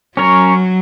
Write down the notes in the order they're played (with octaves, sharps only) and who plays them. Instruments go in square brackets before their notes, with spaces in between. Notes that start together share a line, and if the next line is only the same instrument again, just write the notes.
[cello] F#3 [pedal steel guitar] C#4 A#4 C#5